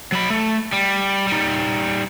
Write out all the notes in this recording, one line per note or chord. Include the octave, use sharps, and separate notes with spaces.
F#3 B5
A3
G3
G3 D#4